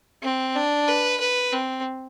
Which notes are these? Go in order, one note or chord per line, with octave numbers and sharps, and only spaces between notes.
C4
D4
B4
B4
C4